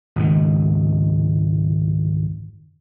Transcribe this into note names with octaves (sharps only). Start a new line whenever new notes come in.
G#1 C#2 F#2 D#3